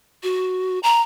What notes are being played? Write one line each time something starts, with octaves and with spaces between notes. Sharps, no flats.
F#4
A#5